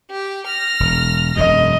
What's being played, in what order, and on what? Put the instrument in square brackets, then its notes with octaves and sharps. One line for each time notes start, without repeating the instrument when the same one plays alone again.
[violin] G4
F6 A#6
[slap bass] E1
[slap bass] E1 F#2 [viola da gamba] D#5